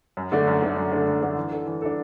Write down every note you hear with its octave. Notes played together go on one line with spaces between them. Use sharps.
F#2
D3 A3 D4
F#2
D3 A3 D4
F#2
D3 A3 D4
F#2
D3 A3 D4
E3
D4 A4
E3
D4 A4